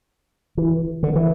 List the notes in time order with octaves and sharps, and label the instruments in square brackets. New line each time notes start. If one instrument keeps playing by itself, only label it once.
[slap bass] E3
D3
E3